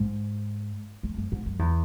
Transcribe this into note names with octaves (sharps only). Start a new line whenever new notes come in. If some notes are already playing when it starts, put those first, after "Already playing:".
Already playing: G#2
E2
F#2
G#2
F#2
E2